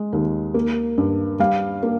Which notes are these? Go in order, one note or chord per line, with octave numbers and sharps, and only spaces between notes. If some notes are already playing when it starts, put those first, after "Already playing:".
Already playing: G#3
D#2
A#3
G2
G3 F5
A#3